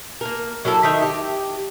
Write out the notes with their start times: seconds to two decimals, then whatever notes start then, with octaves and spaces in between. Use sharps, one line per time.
0.21 A#3 A#4
0.65 F#3 A#3 E4 A4
0.83 D#3 A3 D#4 E5
1.02 G4